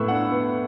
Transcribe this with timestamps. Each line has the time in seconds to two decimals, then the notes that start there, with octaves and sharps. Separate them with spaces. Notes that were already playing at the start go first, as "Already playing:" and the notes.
Already playing: A2 B3 C#6 E6 F#6
0.08 D4 F#5
0.31 B3